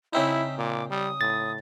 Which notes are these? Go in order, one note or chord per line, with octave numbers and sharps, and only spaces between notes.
C#3 C4 D#4 E4 E5
A#2 D6
G3 D#6
A2 A6